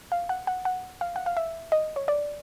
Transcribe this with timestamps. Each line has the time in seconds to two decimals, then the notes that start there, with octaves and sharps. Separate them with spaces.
0.12 F5
0.29 F#5
0.47 F#5
0.65 F#5
1.01 F5
1.16 F#5
1.26 F5
1.37 E5
1.72 D#5
1.96 C#5
2.08 D5